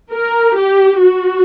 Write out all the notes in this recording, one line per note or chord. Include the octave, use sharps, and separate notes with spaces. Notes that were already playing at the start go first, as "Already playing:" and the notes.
A#4
G4
F#4